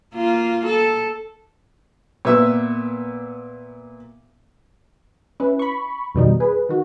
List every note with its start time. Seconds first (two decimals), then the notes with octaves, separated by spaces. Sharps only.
0.14 A#3 F4
0.65 A4
2.25 A#2 B3 E5
5.40 C#4 E4 B4
5.59 B5 C#6
6.15 F2 B2 D#3 G3 D#4
6.40 G#4 B4
6.69 D#3 F#4